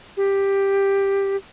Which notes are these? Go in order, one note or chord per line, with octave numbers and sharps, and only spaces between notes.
G4